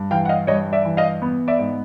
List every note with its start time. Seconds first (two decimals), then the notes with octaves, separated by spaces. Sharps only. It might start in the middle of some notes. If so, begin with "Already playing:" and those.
Already playing: G2
0.11 E3 F5 G5
0.25 F#5
0.29 D#5 F5
0.47 G2 C#5 D#5
0.73 D5 E5
0.85 E3
0.97 D#5 F5
1.22 B3
1.48 D5 E5
1.59 G#2